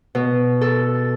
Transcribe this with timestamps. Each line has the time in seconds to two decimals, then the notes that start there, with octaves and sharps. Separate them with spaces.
0.15 B2
0.61 A4